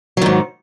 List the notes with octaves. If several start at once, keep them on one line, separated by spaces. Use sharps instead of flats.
G#2 D#3 F#3